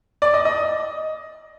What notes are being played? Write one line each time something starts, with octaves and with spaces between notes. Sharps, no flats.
D5
D#5
D#5